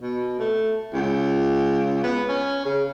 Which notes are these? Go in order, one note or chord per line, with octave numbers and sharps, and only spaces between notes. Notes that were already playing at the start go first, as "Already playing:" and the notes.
B2
A3
C#2
B3
C#4
C#3